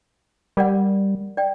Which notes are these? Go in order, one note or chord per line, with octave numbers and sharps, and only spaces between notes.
G3 A#4 D5 F#5
D5 G5